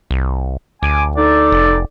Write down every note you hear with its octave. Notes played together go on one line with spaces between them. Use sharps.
C2
D2 G#5 D6
D#4 A4 D5
F1